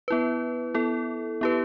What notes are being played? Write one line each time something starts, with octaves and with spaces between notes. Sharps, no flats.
B3 E4 B4
B3 E4 A4
B3 E4 G4 B4